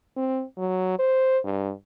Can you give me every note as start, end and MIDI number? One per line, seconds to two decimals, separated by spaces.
0.16 0.43 60
0.57 0.98 54
0.99 1.39 72
1.44 1.72 43